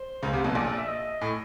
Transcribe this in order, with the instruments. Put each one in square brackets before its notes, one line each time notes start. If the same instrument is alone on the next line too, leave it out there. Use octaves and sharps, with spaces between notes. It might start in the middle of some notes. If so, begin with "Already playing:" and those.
Already playing: [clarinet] C5
[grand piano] C#2 C#3
C2 C3
B1 B2
[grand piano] A#1 A#2 [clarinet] D5
[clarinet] D5
E5
D#5
[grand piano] A2